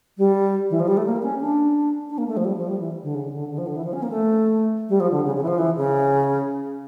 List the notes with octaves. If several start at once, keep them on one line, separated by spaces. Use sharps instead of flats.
G3
E3
F3
G3
A3
A#3
C#4
D4
D4
A#3
A3
F3
G3
F3
G3
E3
D3
C#3
D3
D3
F3
D3
E3
F3
C#4
A#3
A3
G3
F3
D3
C#3
C#3
E3
F3
E3
C#3